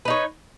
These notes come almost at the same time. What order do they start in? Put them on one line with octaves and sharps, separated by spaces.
B4 D#4 C#5